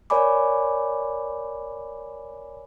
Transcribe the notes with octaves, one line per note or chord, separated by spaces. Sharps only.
A#4 C#5 D5 G#5 B5 D6